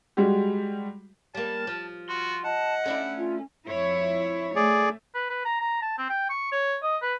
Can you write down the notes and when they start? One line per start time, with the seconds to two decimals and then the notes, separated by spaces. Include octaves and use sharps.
0.17 G3 G#3 F#4 G4
1.35 G3 A#3 A5
1.67 F3
2.09 F4 F#4 C6
2.44 D#5 F#5 A5
2.86 A3 C#4 D4 E4
3.18 F4
3.66 F2 E4 C#5
4.56 A3 G#4 D5
5.14 B4
5.29 B4
5.45 A#5
5.60 A#5
5.82 A5
5.98 C4
6.09 G5
6.29 C#6
6.52 C#5
6.82 D#5
7.02 B4